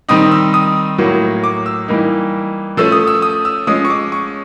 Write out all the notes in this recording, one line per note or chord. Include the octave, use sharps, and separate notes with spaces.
D#3 G3 C4 D#4 D#6
E6
D#6
A2 F#3 A#3
D6
E6
E3 G3 A#3 D#4
F3 A3 C#4 E6
D#6
E6
D#6
E6
F3 G#3 C#4 D#6
C#6
D6
C#6